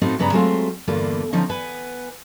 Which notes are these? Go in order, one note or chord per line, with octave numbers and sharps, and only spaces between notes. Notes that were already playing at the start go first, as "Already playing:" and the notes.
A2 B3 C4 D#4 F4 F#4
G2 C#3 B3 B4 D5 A#5
F#3 G#3 A3 C4 F4
E2 G2 D3 A#3 F4
D3 F3 C#4 D#4
B3 B4 G#5